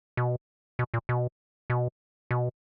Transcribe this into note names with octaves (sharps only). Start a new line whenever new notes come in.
B2
B2
A#2
B2
B2
B2